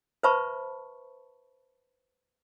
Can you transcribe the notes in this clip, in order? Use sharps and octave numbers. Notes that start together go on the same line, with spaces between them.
B4 C5 E5 A5 B5 C#6